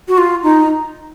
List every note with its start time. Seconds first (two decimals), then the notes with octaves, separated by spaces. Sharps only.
0.08 F#4
0.18 F4
0.43 D#4